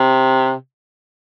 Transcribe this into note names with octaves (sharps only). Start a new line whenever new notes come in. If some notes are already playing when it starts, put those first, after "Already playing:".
Already playing: C3